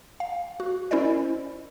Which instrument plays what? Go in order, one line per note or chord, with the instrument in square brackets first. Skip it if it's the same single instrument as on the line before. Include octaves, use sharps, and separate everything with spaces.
[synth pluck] F5
F#4
C#4 E4 A#4 C5 D5 D#5